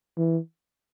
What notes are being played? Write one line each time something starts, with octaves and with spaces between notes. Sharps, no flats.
E3